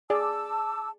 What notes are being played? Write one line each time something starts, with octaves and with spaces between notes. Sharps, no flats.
G#4 D5 A5 D6 E6